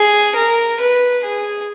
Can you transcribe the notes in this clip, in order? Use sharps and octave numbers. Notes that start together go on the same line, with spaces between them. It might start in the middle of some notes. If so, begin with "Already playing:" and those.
Already playing: G#4
A#4
B4
G#4